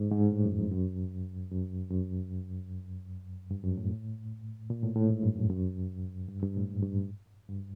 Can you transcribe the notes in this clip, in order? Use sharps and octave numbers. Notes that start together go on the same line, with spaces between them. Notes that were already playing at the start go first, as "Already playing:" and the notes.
Already playing: G#2
G#2
A2
F#2
F2
F#2
F#2
F#2
G2
F#2
A2
A#2
A2
A2
G#2
G2
F#2
F#2
G2
G2
A2
G#2
G2
G2